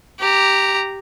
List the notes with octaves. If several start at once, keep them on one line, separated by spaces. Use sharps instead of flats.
G4 A#5